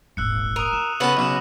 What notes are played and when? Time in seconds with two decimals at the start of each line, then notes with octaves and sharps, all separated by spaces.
0.17 D#1 G#1 E6 F#6 C#7
0.56 A#4 D#6 D#7
0.73 F4 E7 F7
1.00 C#3 B3 F#4 A4 B4
1.17 B1 C#3 E7 F#7